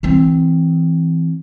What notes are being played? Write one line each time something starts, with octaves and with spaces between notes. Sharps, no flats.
E3 C4